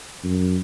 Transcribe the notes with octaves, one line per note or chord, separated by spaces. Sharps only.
F#2